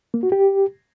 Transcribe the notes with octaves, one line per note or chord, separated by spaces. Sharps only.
A#3
F#4
G4